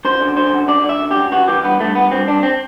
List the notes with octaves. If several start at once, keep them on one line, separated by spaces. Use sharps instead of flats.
F#2 C5
D3
D3 C5
F#2
D3 D5
D3
E5
F#2
G4
F#2
E3 F#4
E3 G4
G2 B3
G2 A3
G2 B3
G2 C4
G2 D4
C4